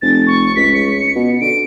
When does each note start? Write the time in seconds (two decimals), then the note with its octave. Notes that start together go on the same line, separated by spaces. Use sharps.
0.02 F1 A6
0.27 C#6
0.56 C#2 B6
0.74 C#7
1.16 B2
1.41 D3 D7